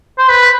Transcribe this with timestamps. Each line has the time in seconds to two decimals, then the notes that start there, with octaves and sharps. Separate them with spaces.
0.18 C5
0.29 B4